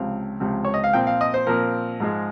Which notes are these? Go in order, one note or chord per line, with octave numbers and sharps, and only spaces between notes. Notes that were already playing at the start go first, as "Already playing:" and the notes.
Already playing: C#2 C3 F3 C4 F5
C#2 C3 F3 C4
C#5
D#5
F5
A#2 F3 C4 G5
F5
D#5
C5
A#2 F3 C4 A#4
G#2 F3 G#3